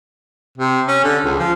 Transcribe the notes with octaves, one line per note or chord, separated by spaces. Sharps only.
C3
C#4
D3
C#2
F3